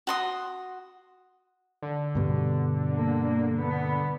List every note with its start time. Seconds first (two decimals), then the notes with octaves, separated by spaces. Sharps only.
0.07 F#4 C6 D#6
1.82 D3
2.15 G2 B2 G3
2.94 A#3
3.61 B3